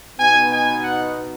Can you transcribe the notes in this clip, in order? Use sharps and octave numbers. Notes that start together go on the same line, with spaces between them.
B2 B3 D#4 G#5
G#5
F#5